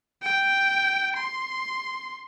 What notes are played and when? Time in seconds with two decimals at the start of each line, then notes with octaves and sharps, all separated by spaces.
0.22 G5
1.17 C6